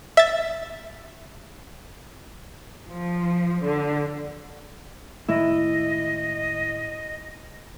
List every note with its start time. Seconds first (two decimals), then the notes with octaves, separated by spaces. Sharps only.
0.17 E5 A6
2.88 F3
3.64 D3
5.29 A2 D#3 G#3 A3 E4 D#5